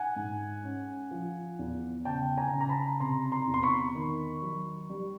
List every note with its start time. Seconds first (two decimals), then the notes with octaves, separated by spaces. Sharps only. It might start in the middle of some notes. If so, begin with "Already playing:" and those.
Already playing: F#5 G#5
0.16 G#2
0.63 C#4
1.11 F3
1.59 E2
2.05 C#3 G5 A5
2.38 G#5 A#5
2.53 C#3
2.60 A#5
2.69 A5 B5
3.00 C3 A#5 C6
3.32 A#5 C6
3.47 E2
3.54 C6
3.63 B5 C#6
3.95 D#3
4.42 F#3
4.90 G3